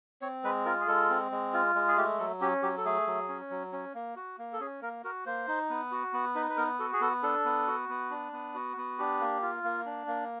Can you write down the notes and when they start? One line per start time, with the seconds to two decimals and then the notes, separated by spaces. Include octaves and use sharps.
0.21 C4 C#5
0.44 G#3 B4
0.65 F4 A#4
0.80 G#4
0.88 G#3 A4
1.10 C4
1.32 G#3
1.54 F4
1.75 G#3
1.88 G#4
1.97 A3 G4
2.19 F#3 A4
2.41 C#4 G4
2.63 F#3 G4
2.78 A4
2.85 A3 G#4
3.07 F#3
3.29 C#4
3.50 F#3
3.73 C#4
3.95 A#3
4.16 F#4
4.38 A#3
4.53 A4
4.60 C#4 G#4
4.82 A#3 A#4
5.04 F#4 A#4
5.26 A#3 C5
5.48 D#4
5.70 B3
5.92 F#4
6.13 B3
6.35 D#4 B4
6.49 B4
6.57 B3 A#4
6.79 F#4 A4
6.93 G#4
7.01 B3 A4
7.23 D4 A4
7.45 B3
7.67 F#4
7.89 B3
8.10 D4
8.32 B3
8.55 F#4
8.77 B3
8.98 D4 G4
9.21 A#3
9.42 F4
9.64 A#3
9.85 D4
10.07 A#3